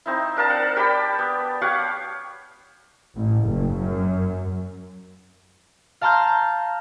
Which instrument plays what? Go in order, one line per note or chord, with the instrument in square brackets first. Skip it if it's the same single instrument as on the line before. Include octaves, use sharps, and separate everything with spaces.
[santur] C4 D#4 E4
D4 A#4 F5 A5
F#5
G4 D5 G5 B5
B3
G4 C#5 F5 F#5
[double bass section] A1
F#1
F#2
[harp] F5 A5 A#5 C6 F6 G6